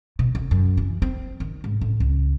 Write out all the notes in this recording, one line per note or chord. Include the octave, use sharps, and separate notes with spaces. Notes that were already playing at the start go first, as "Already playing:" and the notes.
B2
D2
F#2
E3
C4
D#3
G#2
A2
C#2